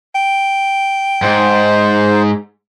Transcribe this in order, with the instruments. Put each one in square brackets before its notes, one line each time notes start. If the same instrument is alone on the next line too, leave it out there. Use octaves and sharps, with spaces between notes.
[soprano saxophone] G5
[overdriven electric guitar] G#2 [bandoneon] C5